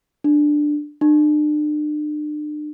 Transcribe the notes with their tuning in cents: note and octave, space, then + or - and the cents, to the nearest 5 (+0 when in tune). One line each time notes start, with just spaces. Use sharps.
D4 +10
D4 +40